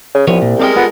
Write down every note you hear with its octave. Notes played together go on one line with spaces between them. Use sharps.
C#3
C2 F3 B3 C#5
A#2
G3 G#3 C4 A#4 D5 G5
B3 F4 A4